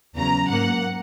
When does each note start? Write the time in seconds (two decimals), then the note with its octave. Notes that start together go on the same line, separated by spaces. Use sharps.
0.15 E2 C#3 F#3 A#5
0.48 G#2 F#3 A#3 F#5